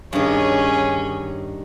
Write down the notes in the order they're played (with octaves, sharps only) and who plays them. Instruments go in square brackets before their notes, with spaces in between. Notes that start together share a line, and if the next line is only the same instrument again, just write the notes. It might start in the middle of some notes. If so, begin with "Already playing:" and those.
[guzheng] G2 D#3 [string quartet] C#4 G#4 C#5